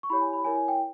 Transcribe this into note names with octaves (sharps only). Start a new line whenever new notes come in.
C#6
E4 G4 C#5 B5
G#5
B5
E4 A#4 C#5 G#5
G#5
G5